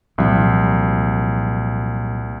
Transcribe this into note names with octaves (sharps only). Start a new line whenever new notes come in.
C2 A#2 F3 F#3